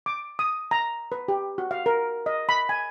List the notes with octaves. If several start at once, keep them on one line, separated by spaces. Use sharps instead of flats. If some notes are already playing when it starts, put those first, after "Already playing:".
D6
D#6
A#5
B4
G4
F#4
F5
A#4
D#5
B5
G#5